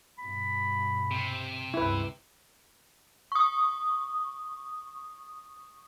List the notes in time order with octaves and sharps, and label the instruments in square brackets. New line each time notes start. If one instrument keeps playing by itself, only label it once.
[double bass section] G2 B2 [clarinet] B5
[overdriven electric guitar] C3
[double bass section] C#2 G2 [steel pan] E4 B4
[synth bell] C#6 D#6